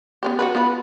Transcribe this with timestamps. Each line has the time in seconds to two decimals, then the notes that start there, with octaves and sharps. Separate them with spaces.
0.23 B3 C#4 G4
0.39 F#4 G#4 B4
0.55 B3 F4 B4